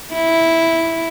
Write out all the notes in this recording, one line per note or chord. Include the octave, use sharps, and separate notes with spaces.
E4